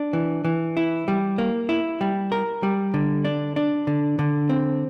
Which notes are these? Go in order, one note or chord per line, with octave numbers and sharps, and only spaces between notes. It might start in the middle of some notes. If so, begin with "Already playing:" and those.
Already playing: D4
E3
E3
E4
G3
A#3
E4
G3
A#4
G3
D3
D4
D4
D3
D3
C4